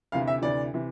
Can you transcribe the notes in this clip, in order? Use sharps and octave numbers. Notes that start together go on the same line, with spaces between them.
D2 C3 E3 F5
E5
D2 C3 E3 D5
C3 E3